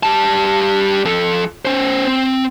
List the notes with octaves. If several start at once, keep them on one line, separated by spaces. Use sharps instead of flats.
G3 A5
F3 A4
C#4 C5
C4